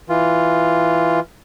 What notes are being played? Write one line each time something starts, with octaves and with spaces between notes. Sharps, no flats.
E3 F4